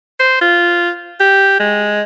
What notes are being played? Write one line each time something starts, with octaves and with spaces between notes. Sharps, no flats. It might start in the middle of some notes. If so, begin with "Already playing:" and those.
C5
F4
G4
G#3